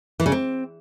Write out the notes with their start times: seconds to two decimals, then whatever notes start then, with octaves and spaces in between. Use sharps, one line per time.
0.20 E3
0.26 C#3
0.32 C4